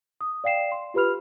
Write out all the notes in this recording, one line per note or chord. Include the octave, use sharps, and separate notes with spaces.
D#6
D5 F5 G5 C7 E7
C6
F4 G4 B4 B5 F6 F7